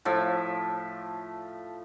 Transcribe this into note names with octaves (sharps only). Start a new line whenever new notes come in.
A2 F3 E5